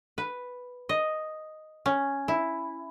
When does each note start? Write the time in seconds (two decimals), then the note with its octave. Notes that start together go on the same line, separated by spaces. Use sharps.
0.18 B4
0.89 D#5
1.86 C#4
2.28 E4